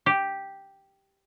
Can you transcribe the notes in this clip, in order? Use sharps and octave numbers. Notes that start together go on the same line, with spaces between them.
G4